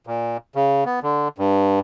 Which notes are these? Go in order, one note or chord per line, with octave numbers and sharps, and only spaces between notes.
A#2
C#3
B3
D3
G2